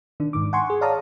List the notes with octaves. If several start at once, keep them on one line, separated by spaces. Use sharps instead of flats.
D#3 D4
G#2 D#3 D6
F#5 G#5 C6 C#6
G#4
C#5 D5 F5 A5 A#5 D#6